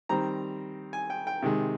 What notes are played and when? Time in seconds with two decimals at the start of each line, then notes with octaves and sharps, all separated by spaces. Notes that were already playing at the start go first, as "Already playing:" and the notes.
0.09 D#3 G3 C4 A#5
0.93 G#5
1.10 G5
1.27 G5
1.42 C3 D#3 G#3